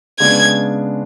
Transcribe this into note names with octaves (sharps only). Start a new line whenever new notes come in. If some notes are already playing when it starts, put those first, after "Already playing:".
C#3 G#3 B3 D4 G#6